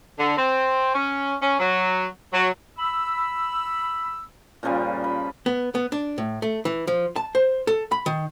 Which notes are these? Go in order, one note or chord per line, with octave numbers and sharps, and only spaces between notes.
D3
C4
C#4
C#4
F#3
F#3
B5 E6
A#2 C#3 F3 G3
B5
B3
B3
D4
A2
A3
E3
F3
A5
C5
A4
B5
D#3